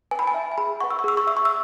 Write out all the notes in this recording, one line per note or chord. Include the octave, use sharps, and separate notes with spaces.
B4 G#5
B5
G#5
E5
G#5
G#4 B5
B4 F#5 C#6
E6
C#6
G#4 E6
C#6
E5 E6
C#6
E6